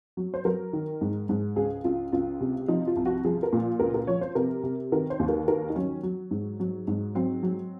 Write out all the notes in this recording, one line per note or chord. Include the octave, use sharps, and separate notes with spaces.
F#3
C5
F#3 A#4
D#3
G#2
G#2
C#2 G#4
C#2 F4
C#2 F4
C3
F3 D#4
F4
C2
F#4
F3 G#4
A#4
A#2
C#2 A#4
A#4
F3 C#5
C5
C3 A#4
C3
D#3 A#4
C5
D#2
A#4
D#3 A#4
D#4
F#3 C#4
F#3
G#2
F#3
G#2
F#3 C4
F#3